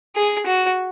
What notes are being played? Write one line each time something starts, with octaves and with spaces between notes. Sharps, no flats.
G#4
F#4